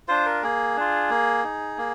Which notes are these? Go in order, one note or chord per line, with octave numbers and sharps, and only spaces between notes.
D4 F4 C5
A#4
A#3 G#4
D4 F4
A#3
D#4
A#3